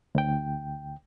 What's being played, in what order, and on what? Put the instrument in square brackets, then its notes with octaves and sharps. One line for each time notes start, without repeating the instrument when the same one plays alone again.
[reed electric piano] D2 G5